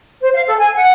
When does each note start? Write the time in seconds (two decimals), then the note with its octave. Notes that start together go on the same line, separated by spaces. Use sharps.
0.21 C5
0.33 F5
0.47 A4
0.59 G#5
0.76 F#5